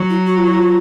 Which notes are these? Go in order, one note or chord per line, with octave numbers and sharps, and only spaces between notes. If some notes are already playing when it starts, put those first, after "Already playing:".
Already playing: F#3
E4
F#4
F4
E4
F4